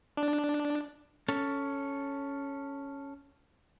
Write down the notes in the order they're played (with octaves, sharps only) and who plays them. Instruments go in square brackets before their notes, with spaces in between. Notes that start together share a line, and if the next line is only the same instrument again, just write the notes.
[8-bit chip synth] D4
[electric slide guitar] C#4 A4